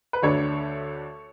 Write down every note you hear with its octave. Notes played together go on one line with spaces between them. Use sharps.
B4
D2 D3 A3 D4 A4 C#5